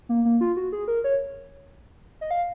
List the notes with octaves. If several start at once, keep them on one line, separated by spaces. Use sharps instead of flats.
A#3
A#3
F4
F#4
G#4
A#4
C#5
D#5
F5